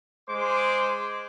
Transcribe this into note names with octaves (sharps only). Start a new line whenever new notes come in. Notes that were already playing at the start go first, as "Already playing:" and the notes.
G#3 C5 D6